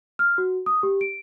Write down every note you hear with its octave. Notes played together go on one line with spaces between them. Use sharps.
F6
F#4
D#6
G4
D7